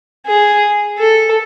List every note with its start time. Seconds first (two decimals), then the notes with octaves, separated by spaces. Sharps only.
0.26 G#4
0.98 A4